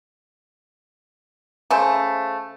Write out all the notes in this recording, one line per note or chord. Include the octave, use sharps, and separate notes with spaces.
C#3 A3 C5